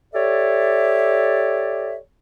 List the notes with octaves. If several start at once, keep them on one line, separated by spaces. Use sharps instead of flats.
G4 A4 C#5 D5 E5